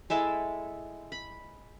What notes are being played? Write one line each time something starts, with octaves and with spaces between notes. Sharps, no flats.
G#3 E4 A4 E5
B5